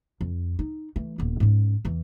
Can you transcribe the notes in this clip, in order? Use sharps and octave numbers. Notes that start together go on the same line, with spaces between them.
F2
D#4
E3 A3
D#1 B3
G#2 C#4
E2 E3